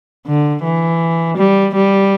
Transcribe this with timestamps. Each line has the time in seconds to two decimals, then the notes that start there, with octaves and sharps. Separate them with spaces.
0.27 D3
0.64 E3
1.38 G3
1.75 G3